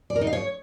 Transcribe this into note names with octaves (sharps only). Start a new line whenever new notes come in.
D5
A#4
D#4
F5
C#5